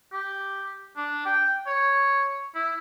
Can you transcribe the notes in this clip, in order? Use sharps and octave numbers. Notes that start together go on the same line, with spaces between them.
G4
D4
G5
C#5
E4